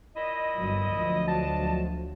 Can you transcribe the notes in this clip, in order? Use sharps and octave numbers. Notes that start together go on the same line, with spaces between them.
A#2 E4 D#5
G1 F#3
D2 F3 F#3
D4 D#5 A5